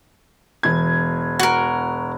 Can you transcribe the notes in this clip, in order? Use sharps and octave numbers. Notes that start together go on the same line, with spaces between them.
E1 G#6
F#4 A#4